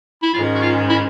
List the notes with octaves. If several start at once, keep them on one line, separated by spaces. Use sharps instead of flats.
E4
G#2 D#3 G#3 C#4 F4
F#4
F4
E4